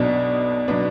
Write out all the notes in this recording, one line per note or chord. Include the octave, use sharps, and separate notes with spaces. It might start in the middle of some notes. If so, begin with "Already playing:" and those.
Already playing: B1 B2 F#3 B3 D4
B2 F#3 B3 D4